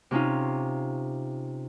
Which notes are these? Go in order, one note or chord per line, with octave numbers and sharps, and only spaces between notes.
C3 C#4 D#4 F4